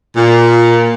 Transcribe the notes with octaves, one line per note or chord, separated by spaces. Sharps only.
A#2